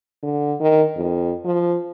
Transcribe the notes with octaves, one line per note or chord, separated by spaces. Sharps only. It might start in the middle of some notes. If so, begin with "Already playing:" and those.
D3
D#3
F2
F3